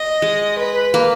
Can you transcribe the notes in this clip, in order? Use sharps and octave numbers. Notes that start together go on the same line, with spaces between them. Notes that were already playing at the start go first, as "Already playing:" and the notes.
Already playing: D#5
G#3
B4
A#3